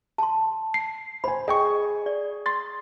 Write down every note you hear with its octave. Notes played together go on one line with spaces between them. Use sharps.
A5 C6
C7
C5 G#5 B5
G#4 D#5 G5 C#6
D5
C6 A6